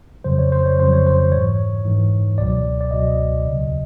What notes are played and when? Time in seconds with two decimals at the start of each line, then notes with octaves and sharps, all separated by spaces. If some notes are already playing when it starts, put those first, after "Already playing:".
0.24 F2 C#3 F#3 C5
0.39 C#5
0.52 C5
0.66 C#5
0.78 F2 C#3 F#3 C5
0.93 C#5
1.07 C5
1.31 G#2 E3 C#5
1.85 G#2 E3
2.38 C#2 B2 F#3 D5
2.81 D5
2.91 C#2 B2 F#3 D#5
3.45 D#2 C#3 F#3